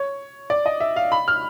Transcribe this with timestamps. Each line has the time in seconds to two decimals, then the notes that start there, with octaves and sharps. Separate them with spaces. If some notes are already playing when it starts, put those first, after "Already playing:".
Already playing: C#5
0.50 D5
0.66 D#5
0.81 E5
0.96 F5
1.12 B5
1.28 F6